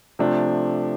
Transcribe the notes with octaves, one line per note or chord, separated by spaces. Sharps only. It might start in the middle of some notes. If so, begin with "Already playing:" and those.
C3 F3 A3 D4